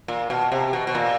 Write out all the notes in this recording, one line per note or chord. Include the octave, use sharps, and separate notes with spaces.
A#2
B2
C3
B2
B2
A#2